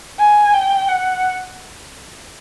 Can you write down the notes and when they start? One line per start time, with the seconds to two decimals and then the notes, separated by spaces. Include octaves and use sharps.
0.19 G#5
0.53 G5
0.88 F#5